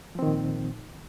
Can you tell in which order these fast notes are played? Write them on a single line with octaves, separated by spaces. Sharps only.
F3 C4 D#3 A#2